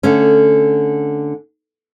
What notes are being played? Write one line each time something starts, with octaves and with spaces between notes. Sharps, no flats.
D3 A3 C#4